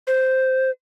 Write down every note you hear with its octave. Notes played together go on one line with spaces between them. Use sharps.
C5